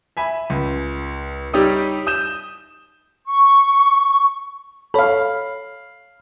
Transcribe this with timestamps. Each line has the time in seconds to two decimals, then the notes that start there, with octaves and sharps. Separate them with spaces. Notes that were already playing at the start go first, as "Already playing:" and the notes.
0.17 E5 G#5 B5
0.50 C#2
1.53 G3 D#4 G4 C#5 D#6 E6
2.07 D#6 G6 E7
3.26 C#6
4.94 A4 C#5 F5 B5